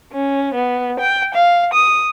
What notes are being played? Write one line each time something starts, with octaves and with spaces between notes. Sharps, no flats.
C#4
B3
G5
F5
D#6